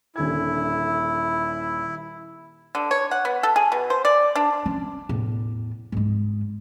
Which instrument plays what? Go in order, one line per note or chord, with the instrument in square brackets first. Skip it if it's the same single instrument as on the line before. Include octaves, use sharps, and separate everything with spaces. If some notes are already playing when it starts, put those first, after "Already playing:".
[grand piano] D#1 D3 G#6 [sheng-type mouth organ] E4
[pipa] D3
C#5
F#5
B3
A4
G#4
B2
C5
D5
D4
[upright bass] C#4
E2 A2
G#2 G#3